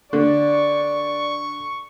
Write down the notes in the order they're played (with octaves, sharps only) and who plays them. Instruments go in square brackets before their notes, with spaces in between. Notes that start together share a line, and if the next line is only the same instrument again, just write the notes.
[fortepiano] D3 [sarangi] D5 [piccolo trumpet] C#6